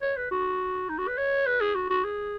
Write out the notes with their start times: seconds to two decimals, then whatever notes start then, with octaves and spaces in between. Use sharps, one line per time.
0.02 C#5
0.17 B4
0.31 F#4
0.89 D#4
0.98 F#4
1.08 B4
1.18 C#5
1.46 B4
1.60 G#4
1.75 F#4
1.90 F#4
2.04 G#4